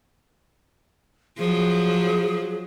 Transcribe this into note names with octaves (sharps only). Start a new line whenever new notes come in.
F3 F#3 G#4